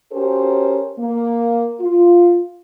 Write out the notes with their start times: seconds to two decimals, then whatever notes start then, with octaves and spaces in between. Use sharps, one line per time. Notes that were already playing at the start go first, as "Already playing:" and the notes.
0.12 C#4 F#4 G4 A4 A#4 C5
0.99 A#3
1.81 F4